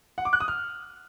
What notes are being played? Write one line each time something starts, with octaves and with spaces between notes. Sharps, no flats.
F#5
D6
F#6
D#6
F6